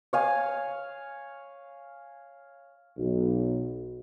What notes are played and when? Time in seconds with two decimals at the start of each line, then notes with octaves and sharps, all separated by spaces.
0.13 C#5 F5 G#5
2.98 B1